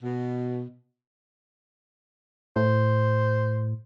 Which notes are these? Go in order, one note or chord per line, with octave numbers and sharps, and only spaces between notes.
B2
A2 C5